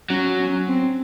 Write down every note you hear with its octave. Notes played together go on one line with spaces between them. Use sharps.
F#3 C#4
C#4
C4